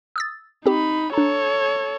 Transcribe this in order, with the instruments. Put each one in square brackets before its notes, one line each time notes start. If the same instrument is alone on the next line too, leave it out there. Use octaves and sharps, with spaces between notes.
[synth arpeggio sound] D#6 E6 A6
[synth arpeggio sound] C4 G4 [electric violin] D#4 B5
[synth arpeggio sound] D4 A#5 [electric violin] A4 C#5